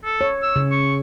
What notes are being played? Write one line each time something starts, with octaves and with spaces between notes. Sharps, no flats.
A4
C#5
E6
C#3
C#6